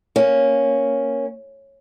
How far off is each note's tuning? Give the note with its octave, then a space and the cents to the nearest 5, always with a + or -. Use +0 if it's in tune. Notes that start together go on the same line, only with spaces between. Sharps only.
A#3 +0 C#4 +0